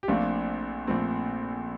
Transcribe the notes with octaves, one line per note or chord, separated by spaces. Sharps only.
G4
A#1 A#2 A3 C4 D4 F4
A#1 A#2 A3 C4